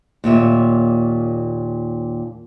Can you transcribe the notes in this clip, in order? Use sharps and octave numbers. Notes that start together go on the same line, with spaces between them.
D#2 A#2 C#5 E5